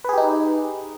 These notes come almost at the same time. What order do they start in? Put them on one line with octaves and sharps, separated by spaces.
B4 G#4 G4 D#4